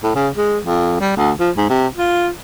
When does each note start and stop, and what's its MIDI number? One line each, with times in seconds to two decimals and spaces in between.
0.03 0.12 45
0.15 0.29 49
0.37 0.58 56
0.64 0.98 41
1.00 1.12 55
1.17 1.32 38
1.40 1.51 53
1.57 1.65 44
1.69 1.88 48
1.97 2.30 65